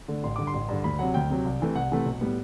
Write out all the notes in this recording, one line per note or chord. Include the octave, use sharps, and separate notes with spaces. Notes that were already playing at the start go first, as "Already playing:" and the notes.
D3 A3
A1 C6
G2 D3 D6
C6
A1
G2 D3
D2 B5
C3 F#3 F#5
D2 G5
C3 F#3
C2
C3 E3 A3
C2 F#5
C3 E3 A3
B1
A2 G3 B3